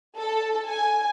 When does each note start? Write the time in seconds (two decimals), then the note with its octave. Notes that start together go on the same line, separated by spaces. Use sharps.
0.17 A4
0.68 G#5